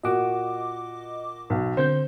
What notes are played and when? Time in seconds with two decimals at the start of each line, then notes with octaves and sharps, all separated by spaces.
0.03 A#2 F#4 D#5 D6
1.50 B1
1.77 D3 C4 C5 G6